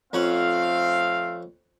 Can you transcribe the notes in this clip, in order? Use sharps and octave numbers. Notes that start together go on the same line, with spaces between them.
F2 A3 C4 C#4 F5 F#5